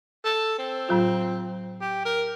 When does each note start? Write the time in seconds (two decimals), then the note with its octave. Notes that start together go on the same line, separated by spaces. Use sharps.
0.25 A4
0.58 C4
0.89 A2 F#3 F4
1.81 G4
2.05 A#4